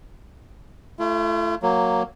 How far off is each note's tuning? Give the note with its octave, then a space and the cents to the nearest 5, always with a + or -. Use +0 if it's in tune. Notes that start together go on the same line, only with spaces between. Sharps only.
A3 -5 F4 -45
F#3 +0 A#3 +0